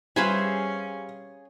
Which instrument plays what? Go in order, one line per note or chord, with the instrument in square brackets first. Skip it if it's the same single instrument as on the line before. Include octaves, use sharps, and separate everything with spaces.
[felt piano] G3 G4 [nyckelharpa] C#4 [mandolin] G#4 F5 [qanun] B4 C5 E5